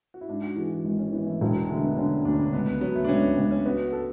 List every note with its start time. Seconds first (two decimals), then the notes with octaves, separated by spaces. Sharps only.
0.14 F#4
0.21 E4
0.28 G#2 D4
0.43 F#4
0.57 E3 G#4
0.71 F#4
0.84 G#1 D4
0.99 C#4
1.13 E3 B3
1.27 A3
1.41 E1 F#3
1.54 F#3
1.64 G#3
1.69 D3 A3
1.83 B3
1.97 D3 C#4
2.25 D2 D4
2.33 C#4
2.42 D4
2.53 C#2 B3
2.66 B3
2.81 F#3 B3
2.95 A3
3.05 D4
3.09 C#2 C#4
3.23 B3
3.37 C#2 C#4
3.51 C#4
3.66 B3 F#4
3.93 A4